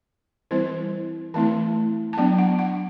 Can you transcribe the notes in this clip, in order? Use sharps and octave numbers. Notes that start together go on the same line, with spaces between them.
E3 G3 C4 E4 C5
E3 A3 C4 E4 A5
A5
F#3 B3 D4 G5
F#5
F#5